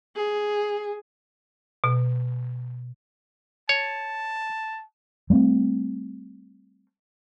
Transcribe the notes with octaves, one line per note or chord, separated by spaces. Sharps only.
G#4
B2
C#5 A5
G3 A3 B3 C4